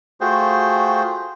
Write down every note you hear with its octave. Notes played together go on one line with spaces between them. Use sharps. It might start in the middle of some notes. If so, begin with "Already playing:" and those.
A3 F4 F#4 G#4 C5 G5